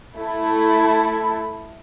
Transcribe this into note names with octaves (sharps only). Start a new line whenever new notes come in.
A3 E4 A4